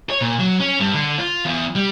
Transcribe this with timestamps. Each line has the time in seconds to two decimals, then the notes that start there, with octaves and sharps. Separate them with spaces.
0.10 C#5
0.21 A#2
0.39 F#3
0.60 C#4
0.80 G2
0.94 D3
1.19 F4
1.45 E2
1.75 G3